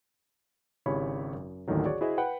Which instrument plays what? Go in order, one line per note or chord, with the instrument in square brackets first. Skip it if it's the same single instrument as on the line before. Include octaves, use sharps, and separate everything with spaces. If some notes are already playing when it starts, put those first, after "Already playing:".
[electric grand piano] G#1 C#3 E4 G4 C#5 B5
F#2
A1 D#2 A2 D3 D#3 F#3
F#4 G#4 C#5 D5
E4 F#4 G#4 C5 D#5 E5
B4 F#5 G5 B5